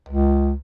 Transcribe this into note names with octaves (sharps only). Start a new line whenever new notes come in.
C#2